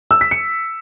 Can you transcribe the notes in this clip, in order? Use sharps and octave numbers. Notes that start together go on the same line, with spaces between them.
E6
B6
C#7